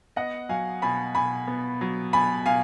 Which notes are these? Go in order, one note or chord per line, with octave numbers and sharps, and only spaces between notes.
B3 D#5 F#5
F#3 F5 G#5
B2 G#5 B5
B2 G#5 B5
B3
F#3
B2 G#5 B5
B2 F5 G#5